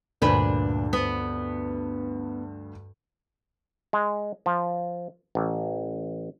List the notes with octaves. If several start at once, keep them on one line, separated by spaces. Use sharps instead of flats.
D2 G2 A#2 D4 B4
B3
G#3
F3
A1